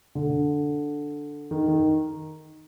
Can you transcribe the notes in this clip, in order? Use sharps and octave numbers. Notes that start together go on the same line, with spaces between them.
D3
D#3
D#3